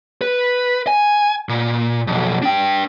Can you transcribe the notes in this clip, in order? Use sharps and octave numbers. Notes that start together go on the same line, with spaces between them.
B4
G#5
A#2
B1 F2
D4 G5